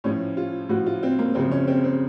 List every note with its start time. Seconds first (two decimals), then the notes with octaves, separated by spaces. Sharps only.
0.04 A2 F3 C#4
0.37 F4
0.69 A2 F3 F#4
0.86 F4
1.03 C4
1.19 A#3
1.35 F#2 C#3 F3 C4
1.51 C#4
1.68 C4
1.84 C4